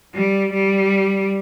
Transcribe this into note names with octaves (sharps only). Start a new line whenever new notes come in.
G3
G3